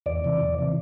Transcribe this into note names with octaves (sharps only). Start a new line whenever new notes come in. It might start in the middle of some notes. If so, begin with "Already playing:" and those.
E2 D5
C3 E3
E2
C3 E3